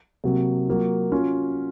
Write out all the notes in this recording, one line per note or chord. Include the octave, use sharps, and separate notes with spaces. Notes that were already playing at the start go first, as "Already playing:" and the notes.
C3 F#3 A#3
F#3 A#3 F4
F#3 C#4 F4